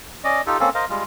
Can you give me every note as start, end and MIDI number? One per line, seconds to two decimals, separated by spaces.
0.24 0.41 61
0.24 0.41 74
0.24 0.41 75
0.47 0.57 63
0.47 0.57 65
0.47 0.57 67
0.47 0.57 69
0.60 0.69 58
0.60 0.69 60
0.60 0.69 61
0.60 0.69 69
0.75 0.85 70
0.75 0.85 72
0.75 0.85 75
0.75 0.85 77
0.89 1.03 55
0.89 1.03 56
0.89 1.03 65